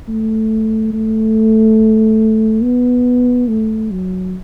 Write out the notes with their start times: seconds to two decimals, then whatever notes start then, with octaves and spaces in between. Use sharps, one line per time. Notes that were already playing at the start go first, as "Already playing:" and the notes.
0.08 A3
0.93 A3
2.63 B3
3.48 A3
3.91 F#3